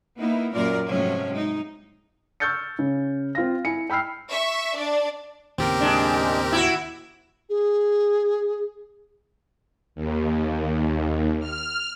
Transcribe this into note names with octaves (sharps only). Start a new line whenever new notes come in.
A#3 B3 D#4 E4
F#2 A#2 A#3 F4 A#4 D5
G#2 C3 F3 F#3 A3 C#4
G#3 D#4
C#6 E6 F6 G6 A6 C#7
C#3
C4 F4 F5 A#6
E4 G#5 C#7
G5 B5 E6 F6 C7
E5 C#6
D4 D5
D#2 A2 C#3 C4 G4 A#4
G#3 D4
E4 F#4
G#4
D#2
F6